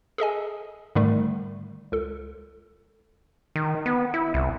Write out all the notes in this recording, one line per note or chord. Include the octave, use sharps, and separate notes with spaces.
G#4 A4 D#5 G#5
G#2 D3 D#3 G3 A3
C#2 A4
D#3
B3
E4
C2